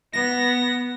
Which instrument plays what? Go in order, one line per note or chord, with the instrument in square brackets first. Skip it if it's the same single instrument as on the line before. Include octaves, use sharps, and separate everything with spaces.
[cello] B3 [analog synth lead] A#6